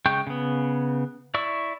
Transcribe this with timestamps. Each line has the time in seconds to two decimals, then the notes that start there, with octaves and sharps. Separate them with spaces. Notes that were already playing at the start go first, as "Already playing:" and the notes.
0.06 C#3 G#3 G5 C#6 G6
0.27 C#3 B3
1.34 E4 D5 C#6 E6